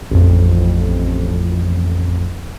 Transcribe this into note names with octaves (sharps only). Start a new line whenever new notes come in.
A1 F2